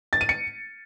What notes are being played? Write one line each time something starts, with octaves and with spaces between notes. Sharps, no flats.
A6
D#7
C#7